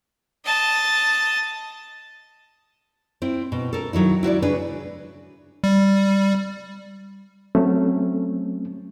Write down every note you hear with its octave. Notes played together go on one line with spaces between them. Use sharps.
D#5 A5
C4 E4
B2
A4 A#4
D#3 F#3 D#4 E4
E4 F#4 C5 D5
C#3 D4 B4
G3
F#3 A3 C4 C#4